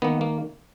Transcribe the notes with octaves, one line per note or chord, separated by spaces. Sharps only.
D#3 A#3 B3
A#3